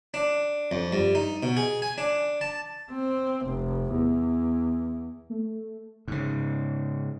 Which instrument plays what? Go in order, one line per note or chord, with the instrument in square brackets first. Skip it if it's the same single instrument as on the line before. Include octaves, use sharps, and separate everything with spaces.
[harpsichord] D4
F2
G2
D#4
B2
G#4
G#5
D4
A5
[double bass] C4
F1
E2
[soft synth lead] A3
[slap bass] G#2 C#3